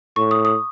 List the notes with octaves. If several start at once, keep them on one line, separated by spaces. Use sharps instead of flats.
A2 C#6
D#6
D#6